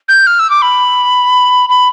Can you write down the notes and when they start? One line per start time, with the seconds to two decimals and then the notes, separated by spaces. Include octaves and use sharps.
0.08 G6
0.27 F6
0.39 E6
0.50 D6
0.62 B5
1.69 B5